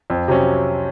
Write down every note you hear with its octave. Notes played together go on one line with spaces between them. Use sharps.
F2
C3 F#3 C#4